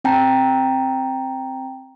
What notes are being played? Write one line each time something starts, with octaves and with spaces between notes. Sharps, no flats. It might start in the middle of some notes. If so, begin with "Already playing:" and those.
C4 G5 A5 A#5